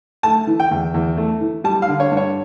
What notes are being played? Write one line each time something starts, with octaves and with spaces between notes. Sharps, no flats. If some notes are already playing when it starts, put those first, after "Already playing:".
A3 A5
E3
G5
E2
E2
A3
E3
G3 A5
F5
D3
C#5
G2
C#5